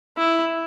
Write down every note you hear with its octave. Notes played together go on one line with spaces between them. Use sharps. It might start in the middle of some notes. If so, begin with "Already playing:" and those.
E4